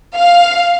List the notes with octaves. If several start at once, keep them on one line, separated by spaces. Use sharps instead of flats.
F5